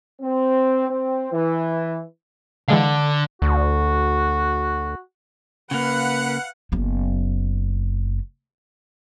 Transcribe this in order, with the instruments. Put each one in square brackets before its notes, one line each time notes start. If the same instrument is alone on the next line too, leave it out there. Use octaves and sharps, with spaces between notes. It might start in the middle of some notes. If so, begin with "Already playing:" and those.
[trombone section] C4
C4
E3
[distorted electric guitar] D3 [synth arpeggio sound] E3 G#3 F5
[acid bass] D2 [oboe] F#4
[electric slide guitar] C#3 A#3 [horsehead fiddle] B4 [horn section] F5 F#5
[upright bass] F#1 B3